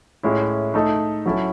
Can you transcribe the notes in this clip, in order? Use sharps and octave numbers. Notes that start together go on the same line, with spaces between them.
A2 G#3 C#4 E4
A3 D#4 A4
F#3 C#4 E4 A4